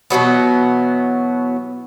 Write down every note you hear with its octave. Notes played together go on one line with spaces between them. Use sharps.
B2 E3 F#3 B3